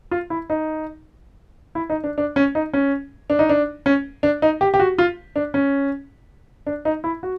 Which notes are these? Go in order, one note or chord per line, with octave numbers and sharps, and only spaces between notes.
F4
E4
D#4
E4
D#4
D4
D4
C#4
D#4
C#4
D4
D#4
D4
C#4
D4
D#4
G4
G4
F#4
F4
D4
C#4
D4
D#4
E4
F#4